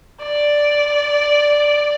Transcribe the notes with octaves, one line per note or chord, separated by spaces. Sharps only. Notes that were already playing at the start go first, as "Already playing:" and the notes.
D5